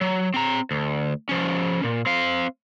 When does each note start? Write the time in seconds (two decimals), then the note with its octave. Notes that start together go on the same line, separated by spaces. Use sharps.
0.01 F#3
0.34 C4 A#5
0.71 D2
1.29 F3 C#4
1.83 A#2
2.06 C4 F5